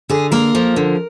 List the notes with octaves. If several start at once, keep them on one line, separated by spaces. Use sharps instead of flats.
D3 G#4
A#3 A#4
F3
D3